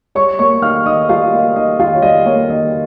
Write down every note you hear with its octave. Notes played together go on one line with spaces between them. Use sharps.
G3 C#5 C#6
A#3 C#5 C#6
D#3 F5 F6
D#3 D#5 D#6
G3 F4 F5
A#3 D#5
D#3 D#5
D#3 F4 F5
C#5
G3 D#5
A#3 C#5
D#3 D#5